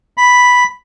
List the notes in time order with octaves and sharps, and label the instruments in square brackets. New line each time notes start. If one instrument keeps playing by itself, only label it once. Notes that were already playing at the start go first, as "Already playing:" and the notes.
[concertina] B5